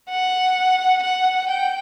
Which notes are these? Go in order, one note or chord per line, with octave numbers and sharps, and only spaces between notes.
F#5
F#5
G5